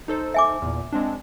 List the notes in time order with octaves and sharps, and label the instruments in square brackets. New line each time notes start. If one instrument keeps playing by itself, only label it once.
[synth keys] D#4 A4 C5
[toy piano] E5 G#5 D6
[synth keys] E2 A#2
G#3 C4 D4